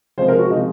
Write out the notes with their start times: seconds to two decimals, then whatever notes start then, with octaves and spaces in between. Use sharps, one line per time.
0.18 C3 F3 G#3 C5
0.28 A#4
0.38 F#4
0.49 C3 F3 G#3 D#4